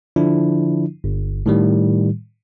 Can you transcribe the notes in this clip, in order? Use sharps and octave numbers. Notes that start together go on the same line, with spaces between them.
D3 F3 D4 E4
G1
A2 D#3 G3